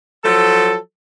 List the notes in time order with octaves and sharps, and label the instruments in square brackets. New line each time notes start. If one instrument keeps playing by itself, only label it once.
[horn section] F3 F#3 A4